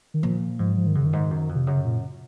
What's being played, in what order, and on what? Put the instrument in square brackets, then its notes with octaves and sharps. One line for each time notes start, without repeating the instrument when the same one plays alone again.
[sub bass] D#3
[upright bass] A#2 [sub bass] F3
[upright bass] G#2 [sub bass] F3
[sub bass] F3
D#3
[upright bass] F#2 [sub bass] C#3
[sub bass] D#3
[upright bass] G#2
F#2
F2
[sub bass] C3
[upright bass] F#2 [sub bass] C#3
[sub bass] A#2